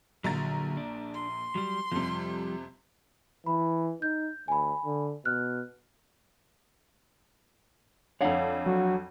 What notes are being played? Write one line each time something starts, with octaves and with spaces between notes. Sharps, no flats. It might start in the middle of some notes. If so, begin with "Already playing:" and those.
A#1 D3 F#3 A#5 A6
D4
C6
F#3 G3
F2 C3 F3 G3
E3 B5
D#4 G6
D2 G#5 B5
D3
B2 F6 F#6
F2 D4 C#5 F5 F#5
F#3 F#4